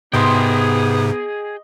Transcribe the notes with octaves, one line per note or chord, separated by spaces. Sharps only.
G#2 C3 B3 G#4 D#5 G5 C6